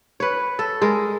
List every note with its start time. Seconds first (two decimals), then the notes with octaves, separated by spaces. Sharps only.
0.20 B4 C#5
0.59 A4
0.81 G#3 A#4